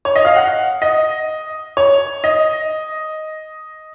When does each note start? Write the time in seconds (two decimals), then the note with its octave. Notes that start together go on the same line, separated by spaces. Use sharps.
0.05 C#5
0.16 D#5
0.25 F5
0.36 F#5
0.82 D#5
1.77 C#5
2.24 D#5